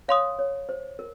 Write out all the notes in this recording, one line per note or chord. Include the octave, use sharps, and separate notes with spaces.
C#5 F5 C6 D#6
C#5
C5
A#4